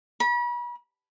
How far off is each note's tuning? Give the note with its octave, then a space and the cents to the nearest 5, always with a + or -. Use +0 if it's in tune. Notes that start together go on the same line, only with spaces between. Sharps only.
B5 -40